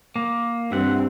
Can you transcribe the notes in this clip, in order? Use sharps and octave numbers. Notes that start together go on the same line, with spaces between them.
A#3
G2 C4 E5 F#5